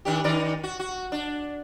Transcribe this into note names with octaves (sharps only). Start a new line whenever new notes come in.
D#3 D4 G4
D#3 D#4 D5
F#4
F#4
D4